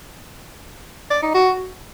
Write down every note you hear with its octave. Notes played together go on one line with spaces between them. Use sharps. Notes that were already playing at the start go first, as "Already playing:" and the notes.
D5
D#4
F#4